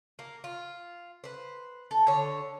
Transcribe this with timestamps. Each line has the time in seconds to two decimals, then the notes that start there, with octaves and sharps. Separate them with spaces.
0.19 A#3
0.44 F4
1.24 B4 C5
1.91 A4
2.07 D3 C#5